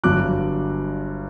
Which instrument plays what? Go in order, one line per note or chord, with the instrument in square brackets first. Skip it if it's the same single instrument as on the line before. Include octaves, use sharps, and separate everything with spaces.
[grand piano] G1 G2 F#3 D6 F#6